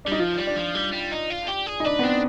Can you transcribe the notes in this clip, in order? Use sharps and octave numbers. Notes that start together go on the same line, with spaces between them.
D4
G3 D#4
F3 F4
G3
D4
F3
G3
G3
D#4
F4
G4
G#4
D#4
D4 B4
B3
C4 D4